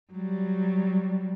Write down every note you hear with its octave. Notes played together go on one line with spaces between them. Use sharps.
F#3 G3